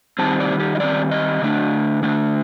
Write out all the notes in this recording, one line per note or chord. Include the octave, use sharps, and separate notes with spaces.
D#3 G3 C4 A5
D5
G4
D#5
D#3 G3 C4 D5
D#5
D3 A3 D4
D3 A3 D4